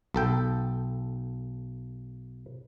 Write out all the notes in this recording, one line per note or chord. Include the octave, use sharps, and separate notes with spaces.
B1 A4 G5